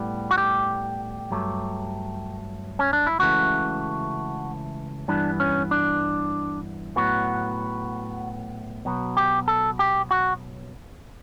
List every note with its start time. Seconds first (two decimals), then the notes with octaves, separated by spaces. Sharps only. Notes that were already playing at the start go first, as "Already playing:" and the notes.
Already playing: A2 G3 B3
0.31 F#4
0.38 G4
1.31 G2 F#3 A3
2.79 C#4
2.93 D4
3.07 E4
3.19 C#2 C#3 E3 A3 F#4
5.08 G2 E3 G3 B3 D4
5.40 C#4
5.71 D4
6.96 A2 F#3 B3 F#4
8.85 B2 F#3 B3
9.17 G4
9.48 A4
9.79 G4
10.11 F#4